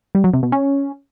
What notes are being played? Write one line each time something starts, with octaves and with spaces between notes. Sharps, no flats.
G3
F#3
C3
B2
C#4